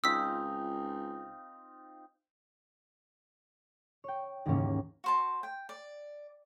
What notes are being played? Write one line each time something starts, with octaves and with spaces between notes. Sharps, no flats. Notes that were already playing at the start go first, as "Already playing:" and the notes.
C#2 C4 D#4 F4 D#6 E6 B6
C#5 G5
D#2 G#2 C#3 E3 A#3 C#4
F#4 C5 A5
G5
D5